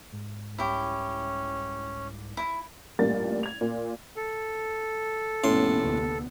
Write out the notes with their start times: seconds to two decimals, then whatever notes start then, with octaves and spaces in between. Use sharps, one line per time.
0.12 G#2
0.58 C2 C#4 E4 G4
2.37 E4
2.99 A1 G2 A#2 A#3 A6
3.43 G#6 F7
3.61 A#2
4.16 A4
5.44 F1 A#1 A2 B3 C#4 C6
5.84 D2